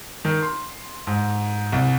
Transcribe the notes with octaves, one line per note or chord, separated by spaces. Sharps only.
D#3
C6
G#2
C2